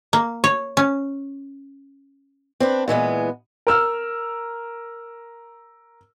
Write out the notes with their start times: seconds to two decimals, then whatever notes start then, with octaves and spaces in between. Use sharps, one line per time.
0.13 A#3
0.44 C#5
0.77 C#4
2.60 C4 D4 B4
2.88 A#2 E3 G#3 B3
3.67 A#4 E6 F6